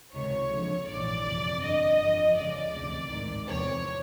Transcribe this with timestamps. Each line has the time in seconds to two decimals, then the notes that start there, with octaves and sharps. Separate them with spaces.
0.13 C#2 C3 D#3 C#5
0.50 D#2 D3 F3
0.87 A#1 G#2 E3 D5
1.25 G1 F2 C3
1.61 G1 G2 D3 F3 D#5
1.98 F2 D3 F3
2.36 C#2 C#3 F3 D5
2.72 D2 C3 E3
3.09 A1 G#2 D#3
3.47 E2 C3 F3 C#5